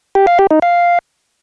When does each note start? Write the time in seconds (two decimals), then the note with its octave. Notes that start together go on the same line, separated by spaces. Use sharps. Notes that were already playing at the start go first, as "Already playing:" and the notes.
0.15 G4
0.27 F5
0.39 G4
0.51 D#4
0.62 F5